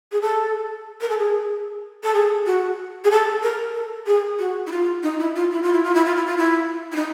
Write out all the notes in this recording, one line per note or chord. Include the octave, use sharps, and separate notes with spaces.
G#4
A4
A#4
A4
G#4
A4
G#4
F#4
G#4
A4
A#4
A4
G#4
F#4
E4
F4
D#4
E4
F4
E4
F4
E4
F4
E4
F4
E4
F4
E4
E4
D#4